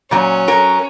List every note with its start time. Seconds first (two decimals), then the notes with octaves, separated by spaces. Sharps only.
0.11 A#2 F#3 C#4
0.48 F#3 A#4